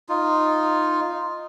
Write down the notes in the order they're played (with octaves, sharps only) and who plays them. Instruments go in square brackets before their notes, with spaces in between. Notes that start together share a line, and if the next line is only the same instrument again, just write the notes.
[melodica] D#4 F4